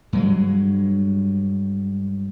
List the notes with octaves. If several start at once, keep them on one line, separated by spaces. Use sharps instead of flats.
G2 F#3 G#3